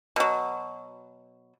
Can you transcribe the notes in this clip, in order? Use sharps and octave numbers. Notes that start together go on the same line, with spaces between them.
B2 F#3